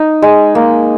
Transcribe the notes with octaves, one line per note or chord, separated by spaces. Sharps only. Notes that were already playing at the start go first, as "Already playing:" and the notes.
Already playing: D#4
G#3
A#3